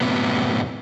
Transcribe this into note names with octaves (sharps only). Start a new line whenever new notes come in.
F#2 A2 C3 B3